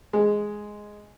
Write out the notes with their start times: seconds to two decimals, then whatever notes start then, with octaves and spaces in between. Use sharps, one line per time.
0.13 G#3